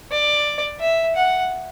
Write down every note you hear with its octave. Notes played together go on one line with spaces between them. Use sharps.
D5
E5
F#5